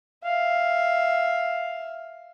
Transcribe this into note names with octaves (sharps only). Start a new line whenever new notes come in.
E5 F5